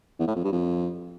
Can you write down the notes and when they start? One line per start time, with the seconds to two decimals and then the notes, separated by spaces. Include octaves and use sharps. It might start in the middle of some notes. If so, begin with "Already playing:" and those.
0.19 E2
0.27 A2
0.36 F2
0.44 G2
0.52 F2